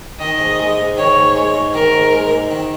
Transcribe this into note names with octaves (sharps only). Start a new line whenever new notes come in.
D#3 D#5
G#2
G#3
G#2
D#3 C#5
G#2
G#3
G#2
D#3 A#4
G#2
G#3
G#2
D#3